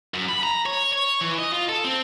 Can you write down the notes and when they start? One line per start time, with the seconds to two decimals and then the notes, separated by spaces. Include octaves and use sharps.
0.14 F#2
0.29 B5
0.43 A#5
0.66 C#5
0.93 C#5
1.21 E3
1.39 D#5
1.52 F4
1.69 A4
1.85 C4